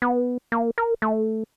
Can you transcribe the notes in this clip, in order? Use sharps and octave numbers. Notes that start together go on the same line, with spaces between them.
B3
A#3
A#4
A3